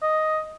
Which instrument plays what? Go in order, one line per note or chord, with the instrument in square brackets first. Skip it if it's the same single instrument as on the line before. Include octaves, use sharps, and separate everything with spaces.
[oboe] D#5